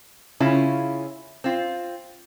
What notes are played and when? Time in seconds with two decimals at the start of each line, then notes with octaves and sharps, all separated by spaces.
0.40 C#3 C#4 E4 F4
1.44 C4 F4